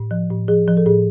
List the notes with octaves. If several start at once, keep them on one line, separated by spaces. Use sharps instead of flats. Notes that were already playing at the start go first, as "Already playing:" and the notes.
Already playing: A2
F3
A2
F3 G#4
F3
A4
A2 G#4